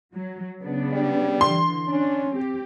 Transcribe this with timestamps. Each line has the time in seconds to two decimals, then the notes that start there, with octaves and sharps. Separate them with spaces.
0.13 F#3
0.62 C#3 B3 D4
0.92 G3
1.41 D3 E3 C6
1.88 C#4 D4
2.31 C4 G4